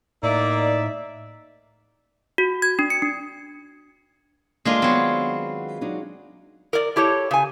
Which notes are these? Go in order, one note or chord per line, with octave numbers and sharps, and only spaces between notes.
A2 A#3 D#4 D5 E5
F#4
G#6
D4
C#7
D4
G#3 A#3 D4 F4 A4 D#5
D#3 F#3 B3 C4 C#5
F#3 D4 D#4
A#4 D5
E4 G4 A4 C#5
C#3 G#5